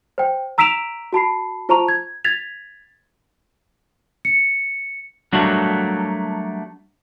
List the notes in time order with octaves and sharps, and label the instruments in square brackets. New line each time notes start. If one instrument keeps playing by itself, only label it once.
[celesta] C5 G5
A#5 E6 B6 D7 E7 F7
F#4 A5 B5 C7
F4 C5 A5 A#5 C#6 F7
G#6
G#6 A6 B6 F7
C#7
[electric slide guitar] F#3 G3 A3 A#3 D4 F#4